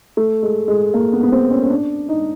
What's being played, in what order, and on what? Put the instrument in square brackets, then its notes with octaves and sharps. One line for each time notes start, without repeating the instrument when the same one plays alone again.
[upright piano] A3
G#3
G#3
A#3
B3
B3
C4
C#4
C#4
D4
D#4